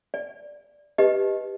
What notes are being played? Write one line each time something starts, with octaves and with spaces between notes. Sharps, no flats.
D5
D#4 G4 B4 D#5